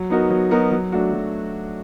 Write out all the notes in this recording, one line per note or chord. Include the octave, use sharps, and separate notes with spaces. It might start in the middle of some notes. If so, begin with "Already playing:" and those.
Already playing: F#3
B3 D#4 F#4 A#4
F#3
B3 D#4 F#4 A#4
F#3
A3 D4 F#4
F#3